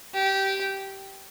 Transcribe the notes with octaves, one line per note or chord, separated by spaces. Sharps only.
G4